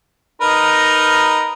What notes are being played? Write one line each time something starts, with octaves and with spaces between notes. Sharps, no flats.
D#4 A#4 B4